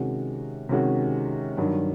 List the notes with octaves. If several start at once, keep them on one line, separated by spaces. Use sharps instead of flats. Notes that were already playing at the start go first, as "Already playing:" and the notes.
Already playing: C3 D#3 G#3 C#4 F#4
C3 D#3 G#3 C#4 F#4
G2 D#3 F#3